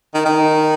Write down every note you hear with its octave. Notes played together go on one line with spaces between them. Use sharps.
D#3
D#3